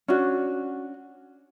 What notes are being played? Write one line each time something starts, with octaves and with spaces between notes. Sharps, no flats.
C#4 D4 F#4